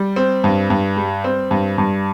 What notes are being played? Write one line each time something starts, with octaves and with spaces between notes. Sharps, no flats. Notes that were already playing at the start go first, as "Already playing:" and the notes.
Already playing: G3
C4
G2
G2
G3
C4
G2
G2